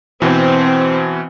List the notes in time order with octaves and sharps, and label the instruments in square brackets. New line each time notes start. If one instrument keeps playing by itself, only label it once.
[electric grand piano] B2 E3 [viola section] C4